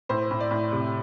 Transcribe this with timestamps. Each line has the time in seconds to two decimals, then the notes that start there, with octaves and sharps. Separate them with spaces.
0.09 A2 C5
0.31 A2
0.40 D5
0.51 A2
0.72 C3